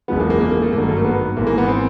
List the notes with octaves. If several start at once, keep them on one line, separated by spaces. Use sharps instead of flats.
F#1 E2 C#3 F3 G#3 B3
A#3
A#3
A#3
A#3
A3
G#1 G2 D#3 F#3 A#3
A3
A#3
B3
G#1 G#2 E3 A#3
A#3
B3
C4